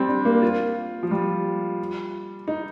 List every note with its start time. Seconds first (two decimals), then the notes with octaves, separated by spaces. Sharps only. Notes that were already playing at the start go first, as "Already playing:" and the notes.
Already playing: G3 C4
0.08 D4
0.25 A#3
0.42 F4
1.03 F3
1.11 G3
2.48 D#4